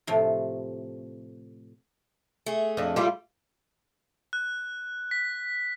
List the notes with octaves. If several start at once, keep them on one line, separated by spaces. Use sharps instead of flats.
A2 C3 F3
A3 G#4
F2 D4
G3 E4 F4
F#6
B6